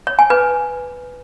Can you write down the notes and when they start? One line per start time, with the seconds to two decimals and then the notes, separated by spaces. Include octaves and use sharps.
0.07 C#5
0.19 G#5
0.30 B4